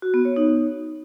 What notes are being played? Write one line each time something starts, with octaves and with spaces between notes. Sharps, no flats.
F#4
B3
C#5
D#4